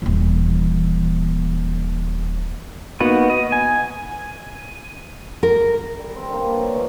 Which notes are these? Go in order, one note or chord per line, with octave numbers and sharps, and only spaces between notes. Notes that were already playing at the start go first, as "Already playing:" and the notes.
D#1 E3
A#3 B3 D#4 F#4 B4
D#5
G#5
A#4
G3
C4 A#4
D3 A#3
B4 A5
F#3 D#5
A#2 D#3 F3